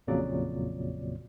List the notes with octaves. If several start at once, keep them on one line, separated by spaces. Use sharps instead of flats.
A1 F2 A#2 C#3 F#3 D5